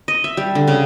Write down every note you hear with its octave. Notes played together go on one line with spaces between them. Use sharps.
D#5
E5
G3
D3
C#3